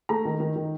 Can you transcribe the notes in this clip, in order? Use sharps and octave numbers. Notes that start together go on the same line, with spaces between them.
A3 A#5
D#3
D#3
D#3